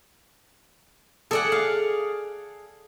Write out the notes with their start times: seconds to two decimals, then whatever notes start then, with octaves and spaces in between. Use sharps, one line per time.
1.31 G#4 A4 D5 F#5
1.52 F5